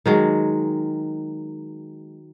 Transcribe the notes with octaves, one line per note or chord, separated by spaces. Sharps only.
D#3 F#3 G#3